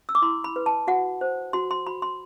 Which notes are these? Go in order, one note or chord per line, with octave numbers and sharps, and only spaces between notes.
E6
D6
E4 C6
B5
B4
A5
F#4 F#5
C5
F#4 C6
C6
F#4 B5
C6